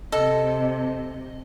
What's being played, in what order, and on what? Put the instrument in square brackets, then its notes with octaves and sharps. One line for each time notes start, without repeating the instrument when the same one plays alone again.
[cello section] C3 [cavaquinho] A4 [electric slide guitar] D#5